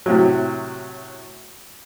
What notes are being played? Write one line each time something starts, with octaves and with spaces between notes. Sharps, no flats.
A2 C3 F#3